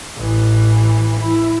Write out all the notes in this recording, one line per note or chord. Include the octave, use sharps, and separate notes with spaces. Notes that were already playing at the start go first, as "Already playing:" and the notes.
A1 E3
E4